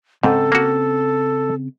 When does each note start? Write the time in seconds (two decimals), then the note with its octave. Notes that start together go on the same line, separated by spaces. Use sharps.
0.23 G#2 C#3 C4 A4 G5
0.52 A#3 F#4